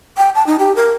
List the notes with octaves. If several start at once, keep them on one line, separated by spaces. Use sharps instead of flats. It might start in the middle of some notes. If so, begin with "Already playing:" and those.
G5
A5
D#4
G4
A#4